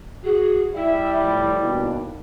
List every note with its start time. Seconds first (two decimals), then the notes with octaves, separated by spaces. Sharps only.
0.24 F#4 G#4
0.76 G3 E4 E5
1.24 A2 F3
1.61 D#2 B2 D4